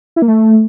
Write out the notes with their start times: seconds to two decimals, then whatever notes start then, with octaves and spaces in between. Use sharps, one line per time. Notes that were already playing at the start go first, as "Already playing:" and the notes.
0.16 E4
0.22 A#3
0.28 A3